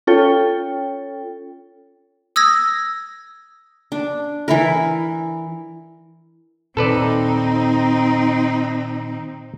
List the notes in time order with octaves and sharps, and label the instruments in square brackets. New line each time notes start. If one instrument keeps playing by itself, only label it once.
[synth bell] C#4 F4 A4 C#5 G5
[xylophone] D#6 E6 G#6 A#6
[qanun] D4
E3 E4 A#4
[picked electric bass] A#2 D#3 [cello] C4 D#4 [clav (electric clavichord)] A4 B4 D5